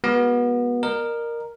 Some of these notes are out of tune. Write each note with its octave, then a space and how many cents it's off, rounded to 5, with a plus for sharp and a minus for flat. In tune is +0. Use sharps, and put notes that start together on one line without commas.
G#3 +0 B3 -25 F#4 +0
A#4 +0 D#5 -45